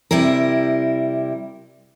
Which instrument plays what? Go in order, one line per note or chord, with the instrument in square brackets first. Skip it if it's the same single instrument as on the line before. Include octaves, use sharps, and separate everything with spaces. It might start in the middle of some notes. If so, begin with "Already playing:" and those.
[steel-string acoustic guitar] C3 G3 E4 A#4